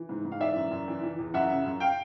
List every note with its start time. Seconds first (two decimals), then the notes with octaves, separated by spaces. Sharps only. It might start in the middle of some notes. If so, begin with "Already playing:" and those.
Already playing: E3
0.09 G#2
0.25 G#2
0.32 F5
0.40 E3 D5 E5
0.56 F#2
0.71 F#2
0.88 E3
1.03 E3
1.19 E2
1.34 F#2 E5 F#5
1.50 C#3
1.65 F#2
1.80 F5 G5